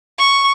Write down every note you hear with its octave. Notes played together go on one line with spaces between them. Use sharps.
C#6